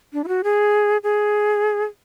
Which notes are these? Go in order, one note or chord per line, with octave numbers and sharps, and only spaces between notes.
D4
E4
F#4
G#4
G#4